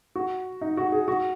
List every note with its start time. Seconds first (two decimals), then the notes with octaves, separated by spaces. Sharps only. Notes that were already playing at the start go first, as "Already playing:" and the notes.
0.16 F#4
0.61 D#4
0.77 F#4
0.92 G#4
1.08 F#4